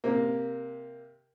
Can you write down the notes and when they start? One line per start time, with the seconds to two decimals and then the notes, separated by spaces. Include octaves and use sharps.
0.04 C3 A#3